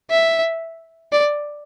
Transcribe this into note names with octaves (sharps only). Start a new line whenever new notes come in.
E5
D5